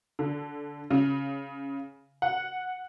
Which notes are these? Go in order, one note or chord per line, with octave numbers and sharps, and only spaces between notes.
D3
C#3
F#5